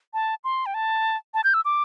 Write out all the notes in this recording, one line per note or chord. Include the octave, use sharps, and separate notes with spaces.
A5
C6
G5
A5
A5
G6
E6
D6